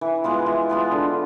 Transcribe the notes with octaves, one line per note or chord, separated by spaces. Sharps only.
E3
G#3 B3 F4
E3
G#3 B3 F4
D3